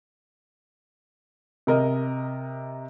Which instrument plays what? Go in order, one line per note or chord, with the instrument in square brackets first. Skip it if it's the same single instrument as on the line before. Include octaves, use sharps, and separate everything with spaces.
[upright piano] C3 A#4 D#5